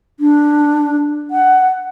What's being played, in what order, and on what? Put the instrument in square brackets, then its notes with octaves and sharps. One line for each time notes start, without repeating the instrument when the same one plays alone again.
[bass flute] D4
F#5